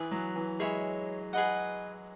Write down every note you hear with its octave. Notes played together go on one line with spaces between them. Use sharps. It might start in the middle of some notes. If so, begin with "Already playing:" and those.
Already playing: E3 G#4 B4 E5
F#3
E3
G#3 G#4 C#5 E5 B5
G#4 B4 D#5 F#5